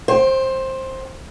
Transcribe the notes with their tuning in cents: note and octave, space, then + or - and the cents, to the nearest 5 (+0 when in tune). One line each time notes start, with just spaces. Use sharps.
C5 +15 G5 +5